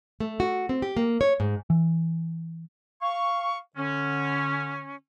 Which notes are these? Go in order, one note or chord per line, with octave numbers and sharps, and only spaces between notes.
A3
F#4
C4
G4
A#3
C#5
G#2
E3
F5 C#6
D3 C#4